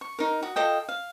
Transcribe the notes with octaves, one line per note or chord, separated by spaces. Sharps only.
C#6
D#4 A#4
F#4 D#6
F4 A4 D#5 G5
F5